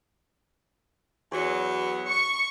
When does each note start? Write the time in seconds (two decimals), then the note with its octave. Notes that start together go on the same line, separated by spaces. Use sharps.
1.32 E2 F#3 B3
2.08 C#6